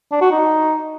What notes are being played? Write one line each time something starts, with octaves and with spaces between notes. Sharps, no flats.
D4
F#4
D#4